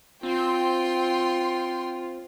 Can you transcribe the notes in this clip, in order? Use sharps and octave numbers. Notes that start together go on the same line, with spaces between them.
C4 F4 G5 C6